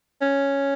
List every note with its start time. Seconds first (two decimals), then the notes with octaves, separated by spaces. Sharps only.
0.22 C#4